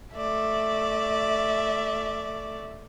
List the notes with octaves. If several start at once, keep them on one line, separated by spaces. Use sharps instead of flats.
A3 D5 E5